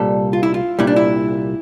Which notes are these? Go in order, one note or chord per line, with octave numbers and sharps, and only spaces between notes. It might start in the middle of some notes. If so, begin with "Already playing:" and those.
Already playing: C2 A#2 G3 A4
F4
E4
F4
C2 A#2 G3 E4
D4
E4